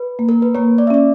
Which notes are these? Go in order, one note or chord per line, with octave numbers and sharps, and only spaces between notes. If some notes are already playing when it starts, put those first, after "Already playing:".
Already playing: B4
A#3
A#4
B4
A#3 C#5
D5
E5
C#4 D5